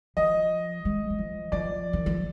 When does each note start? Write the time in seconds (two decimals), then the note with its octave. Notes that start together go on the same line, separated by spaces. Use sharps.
0.17 F3 D#5
0.85 G#3
1.10 F#3
1.18 F3
1.52 F3 D5
1.93 D#3
2.06 F3